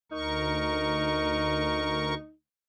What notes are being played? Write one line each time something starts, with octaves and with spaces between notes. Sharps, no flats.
D2 D#4 A#4 C#6